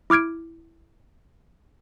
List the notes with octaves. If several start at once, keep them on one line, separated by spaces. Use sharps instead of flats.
E4 D6 F6 G#6 D7